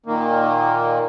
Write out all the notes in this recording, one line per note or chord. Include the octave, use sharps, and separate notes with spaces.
A#2 D#3 A#3